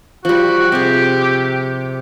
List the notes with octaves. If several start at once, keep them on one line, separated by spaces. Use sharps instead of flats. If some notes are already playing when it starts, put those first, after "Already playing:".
F3 G3 F#4
C3 G4 G#4